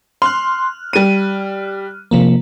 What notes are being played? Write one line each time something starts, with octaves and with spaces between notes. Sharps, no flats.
C6 F6 F#6
G3 D#7
C3 F3 A#3